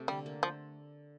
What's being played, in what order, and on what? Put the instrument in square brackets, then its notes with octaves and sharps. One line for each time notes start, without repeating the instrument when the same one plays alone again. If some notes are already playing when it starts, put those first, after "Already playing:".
Already playing: [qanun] C3 A3
[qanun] D3 [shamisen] G3
[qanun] A#3
[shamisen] F3 [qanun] A3